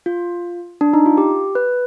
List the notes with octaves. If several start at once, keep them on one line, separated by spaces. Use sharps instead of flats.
F4
D4
D#4
F4
G4
B4